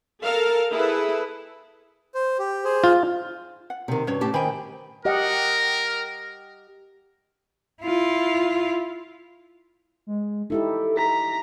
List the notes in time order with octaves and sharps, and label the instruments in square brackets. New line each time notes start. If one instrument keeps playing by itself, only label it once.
[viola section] A4 A#4 F5
E4 G#4 A4 B4
[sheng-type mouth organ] C5
G4
G#4 C5
[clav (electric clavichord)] F4
[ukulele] F#5
[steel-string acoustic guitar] C3 D#3
[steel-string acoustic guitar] G2 [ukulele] C#4 F#4 C#5
[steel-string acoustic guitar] A2 G4 A5
[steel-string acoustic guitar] D#3 G5 [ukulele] C5 G#5 B5
[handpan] G4 D#5 F#5 [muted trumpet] A#4
[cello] E4 F4
[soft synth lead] G#3
[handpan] D#4 E4 G4 [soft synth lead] A4
[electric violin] A#5 [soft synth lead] B6